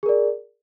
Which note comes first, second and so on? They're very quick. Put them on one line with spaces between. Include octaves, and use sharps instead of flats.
G#4 A#4 D5